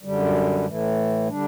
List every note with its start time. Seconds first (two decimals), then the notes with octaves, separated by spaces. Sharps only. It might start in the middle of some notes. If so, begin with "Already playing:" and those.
0.03 F#2 D3 G3
0.66 A2 E3 A3
1.28 D3 G3 D4